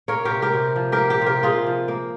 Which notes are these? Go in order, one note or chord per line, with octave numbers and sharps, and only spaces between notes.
A#3 A#4 C#5
G4 A#4
C3
G4 A#4
C3
F3
G4 A#4
A#3
G4
C3
G4 A#4
C3 F4 G#4
F3
A#3